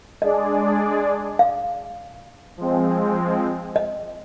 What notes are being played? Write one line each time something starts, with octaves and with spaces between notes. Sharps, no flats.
G#3 D4 G#4 D5 D#5
F5
F3 G#3 C4
D#5